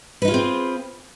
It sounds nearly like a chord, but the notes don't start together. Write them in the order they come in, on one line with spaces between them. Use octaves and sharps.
B4 D#4 F4 G#4 C4